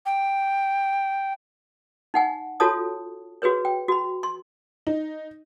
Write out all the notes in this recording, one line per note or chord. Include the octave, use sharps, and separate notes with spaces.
G5
D#4 F#5 G#5
F4 F#4 A4 C#5 A5 D#6
F#4 G#4 B4 C#5
G5
F#4 B5
C6
D#4